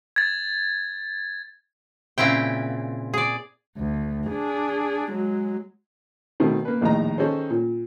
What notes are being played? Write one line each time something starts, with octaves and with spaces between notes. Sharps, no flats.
G#6 A6
A#2 C#3 C4 E4 G5
G#4 D5
D2
D4 G#4
F#3 G#3
B2 D#3 A3 C4
A#3 B4
A#1 D#2 A2 D#5 A#5
D#3 C#4 D#4 G#4 A4 C5
A#2